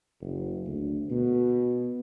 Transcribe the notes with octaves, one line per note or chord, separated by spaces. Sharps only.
F#1
D2
B2